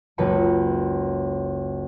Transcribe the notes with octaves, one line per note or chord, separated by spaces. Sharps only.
F#1 C#2 B4 B5 C#7